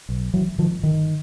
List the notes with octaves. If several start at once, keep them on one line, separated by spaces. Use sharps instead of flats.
B1
G#1 E3 F#3
G#1 D#3 F3
G1 D#3